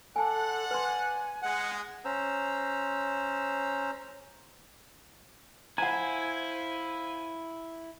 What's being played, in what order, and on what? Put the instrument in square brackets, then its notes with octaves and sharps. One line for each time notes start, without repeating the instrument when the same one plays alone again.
[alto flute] A4 [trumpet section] C5 D5 F#5 [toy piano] G#5 A5
[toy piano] B4 C6 [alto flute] G#5
[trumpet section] G#3 [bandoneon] F#5
[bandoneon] C#4 C5 A#5 E6
[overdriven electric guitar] E4 [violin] C5 F5 [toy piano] F#5 A#5 [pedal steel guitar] G#5